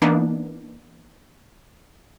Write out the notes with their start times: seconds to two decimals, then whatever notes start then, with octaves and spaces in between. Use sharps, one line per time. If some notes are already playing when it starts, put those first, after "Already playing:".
0.02 E3 A#3 B3 D4 D#4